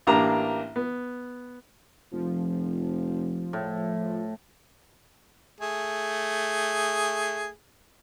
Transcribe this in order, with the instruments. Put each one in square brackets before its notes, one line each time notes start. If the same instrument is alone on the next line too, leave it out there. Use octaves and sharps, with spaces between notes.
[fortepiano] A1 A#3 D4 G4 A#5
B3
[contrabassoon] F1 [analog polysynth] F3
[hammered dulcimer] A2
[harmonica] A3 G#4